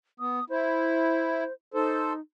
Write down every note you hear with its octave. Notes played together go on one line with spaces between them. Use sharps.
B3 D#6
E4 C5
D#4 A4 C5